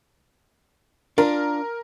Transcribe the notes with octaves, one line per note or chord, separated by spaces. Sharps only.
D4 F4 A#4